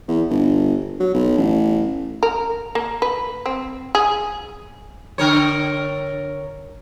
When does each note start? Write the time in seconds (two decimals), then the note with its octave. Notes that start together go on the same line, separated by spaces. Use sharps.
0.08 E2
0.30 G1
1.00 F#3
1.14 B1
1.38 A1
2.23 A#4
2.75 A#3
3.02 B4
3.46 C4
3.95 G#4
5.18 D3 A#4 C#5